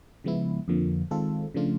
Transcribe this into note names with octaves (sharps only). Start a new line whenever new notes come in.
C#3 F3 G#3 B3 E4
F2 D3 F3 A#3
D#3 G#3 C4 F4 A4
C#3 F3 A3 D4 F4